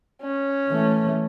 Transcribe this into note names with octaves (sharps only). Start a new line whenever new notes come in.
C#4
E3 A3